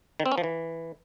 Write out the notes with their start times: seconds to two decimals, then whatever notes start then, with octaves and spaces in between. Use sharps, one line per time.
0.20 D#3
0.26 C4
0.32 C#4
0.38 F3
0.44 E3